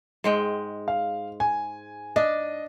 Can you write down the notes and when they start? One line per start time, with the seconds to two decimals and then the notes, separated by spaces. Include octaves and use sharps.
0.24 G#2 G#3 G5
0.88 F5
1.40 G#5
2.16 D4 D#5